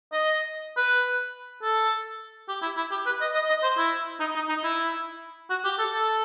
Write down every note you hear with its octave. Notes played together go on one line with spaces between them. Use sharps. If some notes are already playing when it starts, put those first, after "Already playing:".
D#5
B4
A4
G4
E4
E4
G4
B4
D#5
D#5
D#5
C5
E4
D#4
D#4
D#4
E4
F#4
G4
A4
A4